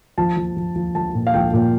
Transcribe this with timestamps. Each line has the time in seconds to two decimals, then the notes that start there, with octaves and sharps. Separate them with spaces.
0.18 F3 A5
0.37 F3
0.57 F3
0.76 F3
0.95 F3 A5
1.15 A#2
1.27 F5
1.34 F3 G5
1.53 A#2